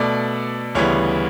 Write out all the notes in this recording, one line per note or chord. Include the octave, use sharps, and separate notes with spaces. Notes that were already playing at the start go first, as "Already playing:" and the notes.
Already playing: B2 A3 D5
D2 C#3 E3 G3 B3 C#5